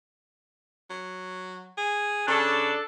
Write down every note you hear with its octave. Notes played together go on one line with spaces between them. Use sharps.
F#3
G#4
C#3 D4 A4